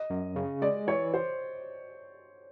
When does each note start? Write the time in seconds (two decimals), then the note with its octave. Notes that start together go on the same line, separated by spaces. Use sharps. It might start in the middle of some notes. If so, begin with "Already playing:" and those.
Already playing: D#5
0.10 F#2
0.36 C#3
0.62 G#3 D5
0.88 E3 C#5
1.14 C5